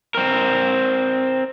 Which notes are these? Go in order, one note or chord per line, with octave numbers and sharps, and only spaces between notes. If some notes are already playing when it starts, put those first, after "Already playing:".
C4 A#4